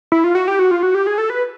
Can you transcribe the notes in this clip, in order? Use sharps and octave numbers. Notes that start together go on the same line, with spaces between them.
E4
F4
F#4
G4
F#4
F4
F#4
G4
G#4
A4
B4